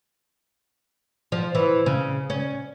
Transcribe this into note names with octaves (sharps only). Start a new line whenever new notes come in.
F3
E3
C#3
C#4